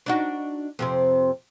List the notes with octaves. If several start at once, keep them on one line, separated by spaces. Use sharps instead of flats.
D4 D#4 F#4
F2 C3 C4